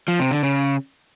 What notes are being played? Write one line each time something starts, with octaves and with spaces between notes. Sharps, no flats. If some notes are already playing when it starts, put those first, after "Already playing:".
F3
C3
D3
C#3